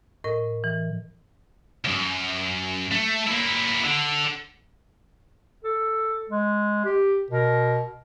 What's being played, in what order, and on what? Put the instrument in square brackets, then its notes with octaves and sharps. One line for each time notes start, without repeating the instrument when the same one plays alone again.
[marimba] A2 A#4 D#5
E3
[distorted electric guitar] C2 F#2
A3
A#3 E4
D3
[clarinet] A4
G#3
G4
[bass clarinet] B2 [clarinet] A#4